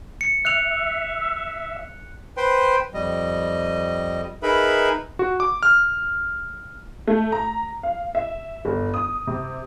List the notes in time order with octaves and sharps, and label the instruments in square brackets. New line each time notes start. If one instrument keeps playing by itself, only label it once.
[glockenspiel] C#7
[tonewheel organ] E5 [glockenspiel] F#6 C#7 F7
[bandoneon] B4 C5 G5 C6
F2 G3 D#5
D#4 G#4 A#4 B4 E5 B5
[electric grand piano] F#4
D6
F6
[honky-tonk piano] A3
A#5
F5
E5
G1
D#6
C3